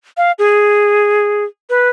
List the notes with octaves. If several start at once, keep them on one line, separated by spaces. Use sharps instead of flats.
F5
G#4
B4